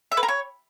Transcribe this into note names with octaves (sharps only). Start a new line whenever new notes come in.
E5
B4
A#4
C#5